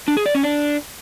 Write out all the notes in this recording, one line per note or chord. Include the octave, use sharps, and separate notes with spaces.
D4
G#4
D5
C#4
D4